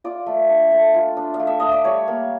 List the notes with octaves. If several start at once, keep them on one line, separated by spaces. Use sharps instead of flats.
F4 D5
A3
D4
A3
F4
D4
F5
A3
E5
A3 D#5
D5
G3 C#5
A#3